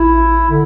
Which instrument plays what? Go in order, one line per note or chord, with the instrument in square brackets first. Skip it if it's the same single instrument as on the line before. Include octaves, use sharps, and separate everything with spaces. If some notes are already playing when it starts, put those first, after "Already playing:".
Already playing: [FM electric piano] A1 [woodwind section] E4
[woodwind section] D3